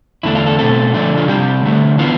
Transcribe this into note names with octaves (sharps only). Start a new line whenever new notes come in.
E2 D3 A3 D4 E4
F4
A4
B2 A3 C4 A4
D3 F3 A3 D4
F4
C3 G3 C4 G4
D3 A3 D4
E3 B3 F4